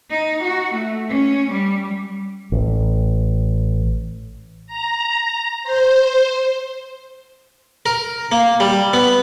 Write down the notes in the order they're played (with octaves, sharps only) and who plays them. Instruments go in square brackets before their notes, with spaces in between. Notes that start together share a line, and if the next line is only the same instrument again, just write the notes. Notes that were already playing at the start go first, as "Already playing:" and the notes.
[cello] D#4
F#4
A3
C#4
G3
[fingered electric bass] A1
[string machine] A#5
C5
[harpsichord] A#4
A#3
G3
B3